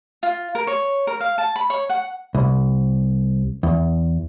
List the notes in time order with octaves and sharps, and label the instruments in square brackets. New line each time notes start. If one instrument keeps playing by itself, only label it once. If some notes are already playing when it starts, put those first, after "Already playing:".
[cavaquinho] F4
A#4
C#5
A#4
F5
A5
B5
C#5
F#5
[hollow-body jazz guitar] C2
E2